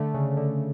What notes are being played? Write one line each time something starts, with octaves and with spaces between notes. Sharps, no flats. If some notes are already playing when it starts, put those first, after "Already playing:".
Already playing: D3 A3
C#3
D3